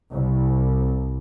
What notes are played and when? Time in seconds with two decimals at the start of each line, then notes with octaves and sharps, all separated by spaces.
0.12 C2